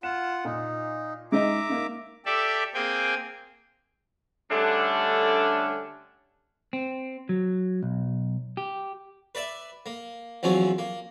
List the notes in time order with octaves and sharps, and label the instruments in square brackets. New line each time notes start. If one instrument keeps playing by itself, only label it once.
[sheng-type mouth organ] F4 F#5 [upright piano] E7
[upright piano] A#2 [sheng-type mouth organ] D#4
[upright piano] G#3 D#4 D#5 [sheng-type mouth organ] E5 A#5 D6
[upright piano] A#3 D#4
[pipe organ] G4 A4 D5 E5
A#3 C4 G#4 G5 G#5
[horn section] D3 G3 A3 C#4 D4
[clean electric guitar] C4
F#3
B1
G4
[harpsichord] B4 D5 E5
A#3
E2 F3 F#3 C4 C#4
A#3